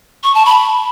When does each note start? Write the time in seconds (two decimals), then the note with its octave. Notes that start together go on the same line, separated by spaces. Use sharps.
0.23 C#6
0.35 A5
0.46 B5